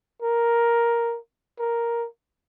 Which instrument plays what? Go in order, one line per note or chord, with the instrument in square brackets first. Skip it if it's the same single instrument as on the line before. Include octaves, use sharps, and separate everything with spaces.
[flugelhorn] A#4
A#4